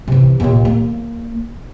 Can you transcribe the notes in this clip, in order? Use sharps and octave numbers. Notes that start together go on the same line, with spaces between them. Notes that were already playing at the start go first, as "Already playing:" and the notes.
C3 E3
D#2 A#2
A#3